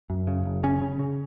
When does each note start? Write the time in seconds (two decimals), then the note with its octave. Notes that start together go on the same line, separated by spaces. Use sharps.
0.10 F#2
0.27 C#3
0.45 F#1
0.63 C#3 C#4
0.82 C#3
0.99 C#3